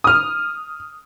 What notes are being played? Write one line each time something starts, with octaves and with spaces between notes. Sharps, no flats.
D#6 F6